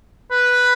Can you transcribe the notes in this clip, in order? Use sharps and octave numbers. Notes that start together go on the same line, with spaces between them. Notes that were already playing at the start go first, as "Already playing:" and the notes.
B4